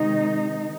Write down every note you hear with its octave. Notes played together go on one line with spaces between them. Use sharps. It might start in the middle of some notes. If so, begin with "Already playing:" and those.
Already playing: C3 D#3 G#3 D#4